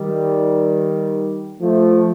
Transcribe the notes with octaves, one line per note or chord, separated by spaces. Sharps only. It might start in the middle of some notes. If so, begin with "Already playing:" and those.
Already playing: D#3 G3
F3 A3